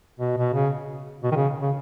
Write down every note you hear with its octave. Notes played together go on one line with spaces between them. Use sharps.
B2
B2
C#3
B2
D#3
C#3
C#3